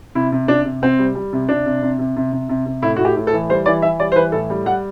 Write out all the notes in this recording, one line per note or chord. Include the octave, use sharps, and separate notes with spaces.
C3 E4
C3
C3 D4
C3
C3 C4
G3
G3
C3
C3 D4
C3
C3
C3
C3
C3
C3
C3
A2 E4
A2 F#4
G4
A2
A4
E3
G3 C5
E3 D5
E3 E5
G3 D5
C5
E3 B4
A2 A4
G3
G3 F#5